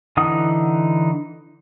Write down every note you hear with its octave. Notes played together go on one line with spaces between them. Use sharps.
D3 E3 D#4 F#5 D#6